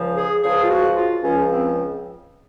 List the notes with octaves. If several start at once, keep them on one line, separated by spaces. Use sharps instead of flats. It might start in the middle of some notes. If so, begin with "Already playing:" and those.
Already playing: C#2 C#3 F3
G#4
C#2 C#3 F3 G#4
F4
F#4
F4
C#2 C#3 F3 C#4
C4